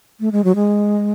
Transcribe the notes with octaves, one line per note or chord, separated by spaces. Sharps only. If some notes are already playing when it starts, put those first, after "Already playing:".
A3
G#3
F#3
G#3